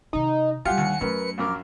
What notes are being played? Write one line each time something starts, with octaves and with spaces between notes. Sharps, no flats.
C3 D#3 D#4
G3 D4 F4 G4 F5 F#5 G#5 C#7
D#2
F#2 F#3 A3 A#4 B4
A#1 F#2 A#4 C6 D6 F6